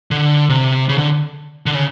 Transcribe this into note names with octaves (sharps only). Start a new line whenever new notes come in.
D3
C3
C#3
D3
D3
C#3